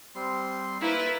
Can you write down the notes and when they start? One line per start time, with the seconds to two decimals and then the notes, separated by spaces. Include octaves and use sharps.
0.15 G3 C4 C6
0.81 A#3 E4 F4 A#4 B4 E6